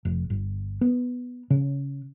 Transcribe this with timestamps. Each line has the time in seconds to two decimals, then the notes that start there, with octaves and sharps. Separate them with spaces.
0.05 F1
0.30 G1
0.81 B3
1.50 C#3